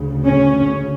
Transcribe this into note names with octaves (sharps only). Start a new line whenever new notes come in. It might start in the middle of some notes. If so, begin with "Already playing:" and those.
Already playing: D2 C#3
C#4